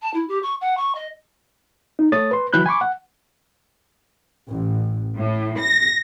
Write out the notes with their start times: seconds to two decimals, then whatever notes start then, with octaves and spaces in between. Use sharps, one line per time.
0.02 A5
0.14 E4
0.28 G4
0.43 C#6
0.61 F#5
0.77 C#6
0.95 D#5
1.99 D#4
2.12 A3 A4 C#5 D#6 A6
2.31 B4 C6
2.53 D2 E3 F#3 B5 F#6 G6
2.66 G#5 B5 C#6 D6
2.81 F#5
4.49 A1
5.18 A2
5.60 A#6